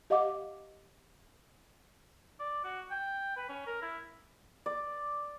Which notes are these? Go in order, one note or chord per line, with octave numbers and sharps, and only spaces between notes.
G4 D#5 F5 F#5 D6
D5
F#4
G5
B4
C#4
A#4
E4
D5